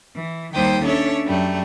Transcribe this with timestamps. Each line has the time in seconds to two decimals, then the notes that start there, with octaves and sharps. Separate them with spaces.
0.14 E3
0.54 D#2 D#3 G3 C5 G5 D#6
0.83 C#4 D4 A4 C#5 E5
1.24 F#2 G3 A3